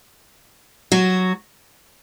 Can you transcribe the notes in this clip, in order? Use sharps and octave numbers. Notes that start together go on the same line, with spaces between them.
F#3 F#4